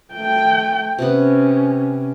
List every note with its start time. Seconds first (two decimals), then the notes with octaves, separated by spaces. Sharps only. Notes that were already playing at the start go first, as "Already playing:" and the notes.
0.14 A3 G5
0.99 C3 B3 C#4